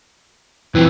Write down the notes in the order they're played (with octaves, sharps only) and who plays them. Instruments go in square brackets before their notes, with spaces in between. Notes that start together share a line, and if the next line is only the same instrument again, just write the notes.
[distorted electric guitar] F2 [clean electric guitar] E3